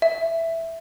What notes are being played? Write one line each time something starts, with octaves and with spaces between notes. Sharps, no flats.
E5